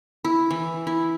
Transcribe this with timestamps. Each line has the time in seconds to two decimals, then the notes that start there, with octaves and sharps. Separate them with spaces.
0.24 E4
0.50 E3
0.87 E4